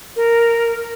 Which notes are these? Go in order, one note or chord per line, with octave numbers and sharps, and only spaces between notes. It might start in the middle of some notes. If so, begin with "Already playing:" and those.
A#4